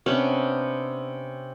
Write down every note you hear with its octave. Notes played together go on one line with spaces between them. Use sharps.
C3 B3 C#4 D4